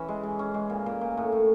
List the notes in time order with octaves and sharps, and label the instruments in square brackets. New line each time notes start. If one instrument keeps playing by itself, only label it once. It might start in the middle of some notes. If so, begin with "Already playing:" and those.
Already playing: [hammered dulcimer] E3 C#4
G#3
G#3
C#4
G#3
A#2
A#2
A#2
A2
A2